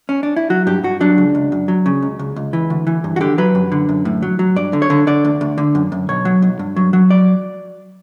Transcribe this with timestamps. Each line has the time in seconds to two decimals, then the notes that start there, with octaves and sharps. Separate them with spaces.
0.09 C#4
0.23 D4
0.36 E4
0.50 F#3 F#4
0.67 G2 G4
0.83 G2 F#4
1.01 F#3 D4
1.18 C#2
1.35 C#2
1.52 F#2
1.68 F#3
1.86 C#3
2.02 C#2
2.19 C#2
2.36 C#2
2.53 E3
2.70 D2
2.87 E3
3.04 G2
3.16 F#4
3.21 D3 G4
3.38 F#3 B4
3.55 F#2
3.72 D3
3.89 F#2
4.05 A2
4.22 F#3
4.39 F#3
4.56 G2 D5
4.73 D3
4.82 C#5
4.90 D3
5.07 D3 D5
5.25 D2
5.41 D2
5.58 D3
5.75 F#2
5.92 F#2
6.09 B1 C#5
6.25 F#3
6.42 B1
6.59 G2
6.76 F#3
6.93 F#3
7.10 D5